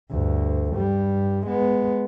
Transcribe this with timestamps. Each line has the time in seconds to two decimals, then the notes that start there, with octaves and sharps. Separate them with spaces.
0.11 D2 G2
0.73 G2 G3
1.47 G#3 B3